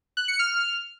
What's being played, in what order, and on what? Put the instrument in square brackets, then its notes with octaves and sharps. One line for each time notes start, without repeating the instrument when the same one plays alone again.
[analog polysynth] F#6
C#7
F6